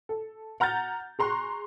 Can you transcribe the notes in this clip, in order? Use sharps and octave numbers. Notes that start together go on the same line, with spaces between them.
A4
F#5 A#5 F6 G6 A6
G#4 A#5 C6 C#6 F#6